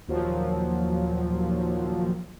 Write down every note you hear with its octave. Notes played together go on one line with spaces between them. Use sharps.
D#2 A#2 F3 F#3